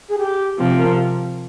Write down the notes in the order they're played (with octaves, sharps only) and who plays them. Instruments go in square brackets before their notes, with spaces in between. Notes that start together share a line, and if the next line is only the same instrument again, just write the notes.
[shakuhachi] G#4
G4
[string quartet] C3 F3 C4 [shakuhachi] G4
[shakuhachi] A#4